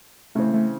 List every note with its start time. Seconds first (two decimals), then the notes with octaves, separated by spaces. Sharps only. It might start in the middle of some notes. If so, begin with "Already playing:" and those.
0.35 C#3 E3 A3 C4
0.53 A3